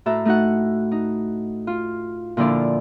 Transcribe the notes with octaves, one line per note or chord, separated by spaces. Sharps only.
A2 F#4 A4 E5 A#5
A3 D#4 F#4 F#5
D#4
F4
A#2 D3 F3 E4 D5